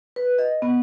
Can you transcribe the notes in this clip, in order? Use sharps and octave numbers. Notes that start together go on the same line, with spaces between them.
B4
D#5
B3